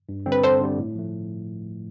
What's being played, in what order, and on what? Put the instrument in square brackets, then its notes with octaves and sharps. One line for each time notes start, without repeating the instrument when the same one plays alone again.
[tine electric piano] G2
D3 G3 C4
[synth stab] B4
[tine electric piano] G2 [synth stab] A4 C5
[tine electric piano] D3 G3 C4
A2
F3 A3